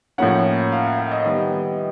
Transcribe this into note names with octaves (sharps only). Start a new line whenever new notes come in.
A2 F3 A#3 C#4 F#5
F5
F#5
E5
D#5
D#3 G3 B3